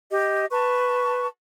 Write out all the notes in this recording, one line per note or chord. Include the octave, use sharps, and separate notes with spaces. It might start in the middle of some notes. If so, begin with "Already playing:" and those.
G4 D#5
B4 A5 C#6